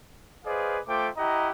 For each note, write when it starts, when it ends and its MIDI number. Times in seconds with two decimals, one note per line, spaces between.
0.45 0.78 68
0.45 0.78 71
0.45 0.78 72
0.45 0.78 74
0.45 0.78 75
0.45 0.78 77
0.88 1.08 57
0.88 1.08 65
0.88 1.08 72
0.88 1.08 79
0.88 1.08 86
1.17 1.50 64
1.17 1.50 67
1.17 1.50 75
1.17 1.50 78
1.17 1.50 82